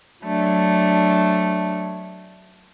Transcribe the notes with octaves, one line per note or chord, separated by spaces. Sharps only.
F#3 A3 D4